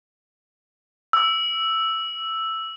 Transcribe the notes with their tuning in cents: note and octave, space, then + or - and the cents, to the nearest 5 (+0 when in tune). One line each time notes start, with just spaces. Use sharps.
E6 +0